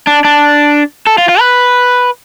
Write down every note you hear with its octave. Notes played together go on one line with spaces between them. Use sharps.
D4
D4
A4
F4
F4
B4